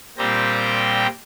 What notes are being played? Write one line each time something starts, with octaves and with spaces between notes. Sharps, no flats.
A#2 G3 C4 G4 G5 A#5